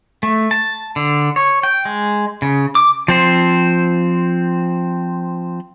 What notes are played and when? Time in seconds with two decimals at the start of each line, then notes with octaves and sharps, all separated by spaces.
0.23 A3
0.51 A5
0.96 D3
1.36 C#5
1.63 G5
1.85 G#3
2.42 C#3
2.75 D6
3.08 F3 C4 C5